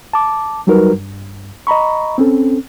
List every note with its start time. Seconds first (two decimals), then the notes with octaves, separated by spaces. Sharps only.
0.13 A5 D6
0.67 F#3 G3 D#4 F#4 A#4 B4
0.93 G2
1.67 D#5 A#5 B5 C#6
2.18 C4 C#4 A4